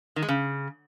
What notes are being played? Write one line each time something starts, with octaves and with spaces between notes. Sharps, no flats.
D#3
G#3
C#3